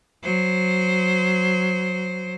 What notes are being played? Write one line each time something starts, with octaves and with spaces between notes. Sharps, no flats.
F#3 C5